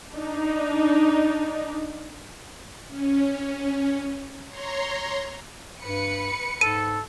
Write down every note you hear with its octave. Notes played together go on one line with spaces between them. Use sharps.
D4 D#4
C#4
C#5 A#5 C6
G2 B4 C#7
G#2 A4 D#7